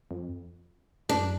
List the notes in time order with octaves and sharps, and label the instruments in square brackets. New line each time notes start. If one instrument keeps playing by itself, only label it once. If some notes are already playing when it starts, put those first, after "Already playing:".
[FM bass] F2
[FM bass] F#2 [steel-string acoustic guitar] D4